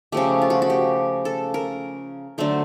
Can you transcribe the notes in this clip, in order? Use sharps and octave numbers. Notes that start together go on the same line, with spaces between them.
C#3 F3 A3 G4
F4
F#4
F#4
G4
A4
A#4
D3 F#3 A3 C5